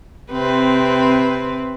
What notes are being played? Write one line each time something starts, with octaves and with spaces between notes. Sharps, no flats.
C3 C4 B4